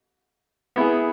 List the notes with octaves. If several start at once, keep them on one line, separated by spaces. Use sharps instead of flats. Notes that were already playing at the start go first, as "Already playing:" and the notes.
B3 E4 G#4